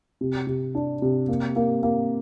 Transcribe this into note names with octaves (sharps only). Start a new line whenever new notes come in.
C3
C3
D4
C3
A#3
A#3
A#3